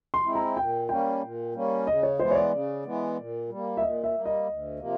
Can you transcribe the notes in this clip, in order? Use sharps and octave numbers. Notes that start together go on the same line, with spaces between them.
C6
G#3 C4 E4
A#5
A#2 G5
G3 A#3 C#4 G5
A#2
G3 A#3 C#4
C#3 D#5
C#5
E3 G#3 B3 C5
C#5
D5
C#3
E3 G#3 B3
A#2
G3 A#3
E5
A#2 D#5
E5
G3 A#3
D#5
D2
C3 F3 A#3